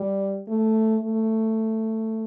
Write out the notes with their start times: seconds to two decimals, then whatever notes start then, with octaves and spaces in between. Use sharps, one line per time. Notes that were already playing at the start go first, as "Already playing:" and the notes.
Already playing: G3
0.49 A3
1.03 A3